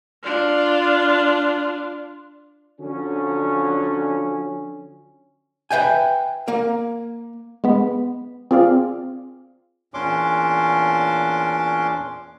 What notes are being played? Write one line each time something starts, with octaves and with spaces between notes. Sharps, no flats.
D4 F4
D3 F3 F#3 C#4
B4 E5 G5 G#5
A#3 A#4
G#3 B3 B5
C4 F4 G#4 D5 F5
E2 A#2 C#4 D4 C6 D6